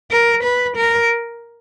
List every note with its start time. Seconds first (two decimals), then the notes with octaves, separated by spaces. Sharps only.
0.11 A#4
0.43 B4
0.76 A#4